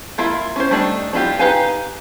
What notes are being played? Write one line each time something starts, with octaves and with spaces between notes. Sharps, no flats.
A#3 E4 F4 E5
C#4 C5
G3 A3 C4 D4 D#4
D4 E4 F4 G4
D#4 G4 B4 F5 G#5